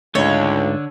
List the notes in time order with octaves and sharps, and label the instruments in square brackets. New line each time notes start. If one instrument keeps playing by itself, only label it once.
[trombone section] C#2 [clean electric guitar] G#2 A3 [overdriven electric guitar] D3 [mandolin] C#5